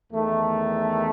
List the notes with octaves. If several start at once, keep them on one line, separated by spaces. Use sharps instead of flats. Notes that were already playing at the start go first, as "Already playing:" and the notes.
E2 D#3 A3